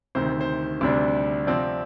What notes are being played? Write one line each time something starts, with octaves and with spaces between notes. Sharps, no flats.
D2 C3 D#3 C5
C5
D2 C3 G3 D4
C3 F3 C4 D5